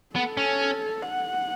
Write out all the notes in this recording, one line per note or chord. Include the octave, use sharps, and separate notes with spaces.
B3 A4
C#4
F#5